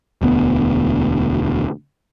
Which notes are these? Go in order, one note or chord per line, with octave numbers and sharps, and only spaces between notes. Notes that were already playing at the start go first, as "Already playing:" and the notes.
E1 D2 B3